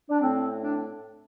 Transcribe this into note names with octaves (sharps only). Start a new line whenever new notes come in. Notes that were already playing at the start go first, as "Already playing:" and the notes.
D4
A2 A3 C4
D4